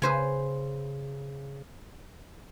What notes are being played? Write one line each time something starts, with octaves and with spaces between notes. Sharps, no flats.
C#3 B4 C5 G#5